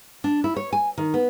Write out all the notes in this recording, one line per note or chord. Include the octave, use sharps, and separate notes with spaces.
D4
E4
C#5
G#5
D#3
B3